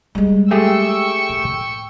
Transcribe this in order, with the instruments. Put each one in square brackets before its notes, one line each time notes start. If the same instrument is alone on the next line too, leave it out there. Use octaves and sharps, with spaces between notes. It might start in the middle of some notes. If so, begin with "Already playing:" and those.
[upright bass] G3 G#3
[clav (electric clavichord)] A3 G4 G#4 [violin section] G5 C#6 E6
[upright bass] A2